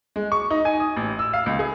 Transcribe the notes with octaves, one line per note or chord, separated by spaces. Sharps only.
G#3
C#6
D#4
G#5
D#6
A1
E6
F5
C#2
G#4